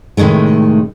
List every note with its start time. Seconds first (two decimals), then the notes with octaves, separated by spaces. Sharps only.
0.17 A2 C3 D#3 G#3 A3